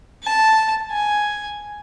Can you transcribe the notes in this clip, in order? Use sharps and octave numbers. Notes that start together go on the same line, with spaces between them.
A5
G#5